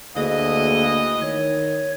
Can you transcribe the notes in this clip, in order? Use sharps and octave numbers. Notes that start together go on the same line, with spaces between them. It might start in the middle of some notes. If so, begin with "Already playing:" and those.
D2 E3 A#3 G#4 D#5
D#3 C#5